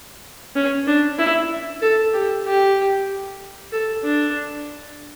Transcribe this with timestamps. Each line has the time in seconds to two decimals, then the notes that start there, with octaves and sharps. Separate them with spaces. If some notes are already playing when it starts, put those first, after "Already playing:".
0.55 C#4
0.87 D4
1.19 E4
1.82 A4
2.13 G4
2.45 G4
3.72 A4
4.04 D4